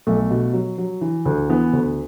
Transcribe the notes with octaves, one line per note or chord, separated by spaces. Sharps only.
B1 A3
B2
F#3
F#3
E3
D2
E3 B3
D2